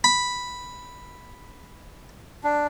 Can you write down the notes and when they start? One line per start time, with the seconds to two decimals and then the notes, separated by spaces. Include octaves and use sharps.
0.04 B5
2.44 D4